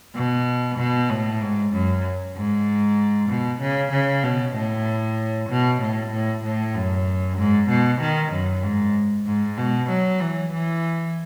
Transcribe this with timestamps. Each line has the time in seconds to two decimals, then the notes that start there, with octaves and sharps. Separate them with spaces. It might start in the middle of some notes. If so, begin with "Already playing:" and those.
0.15 B2
0.78 B2
1.10 A2
1.41 G#2
1.73 F#2
2.36 G#2
3.29 B2
3.61 C#3
3.92 C#3
4.23 B2
4.55 A2
5.49 B2
5.81 A2
6.12 A2
6.44 A2
6.75 F#2
7.38 G#2
7.69 B2
8.01 D#3
8.32 F#2
8.63 G#2
9.26 G#2
9.58 B2
9.89 F#3
10.20 E3
10.53 E3